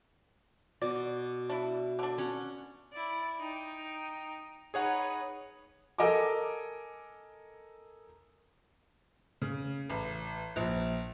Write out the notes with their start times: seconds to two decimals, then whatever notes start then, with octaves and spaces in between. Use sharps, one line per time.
0.82 B2 D5
1.49 D4 E4
1.99 D3 D4
2.18 C#4 F#5
2.93 E4 D5
3.40 D#4 G5
4.74 D#4 G#4 B4 C#5 F#5
5.98 A4 A#4 D#5 G#5 D6
9.42 C#3
9.90 A1
10.56 A#1